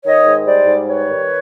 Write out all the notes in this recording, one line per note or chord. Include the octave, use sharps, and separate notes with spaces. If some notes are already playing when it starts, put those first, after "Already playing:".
D#3 C#5 D#5
G#2
G3 C5 D5
G#2
G3 B4 C#5
D#3